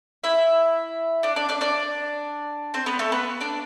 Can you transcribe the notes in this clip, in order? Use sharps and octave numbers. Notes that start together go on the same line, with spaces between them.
E4 E5
D4 D5
D4 D5
D4 D5
D4 D5
C4 C5
B3 B4
A3 A4
B3 B4
D4 D5